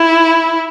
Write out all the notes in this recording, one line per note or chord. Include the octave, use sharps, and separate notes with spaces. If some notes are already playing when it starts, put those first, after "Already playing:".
Already playing: E4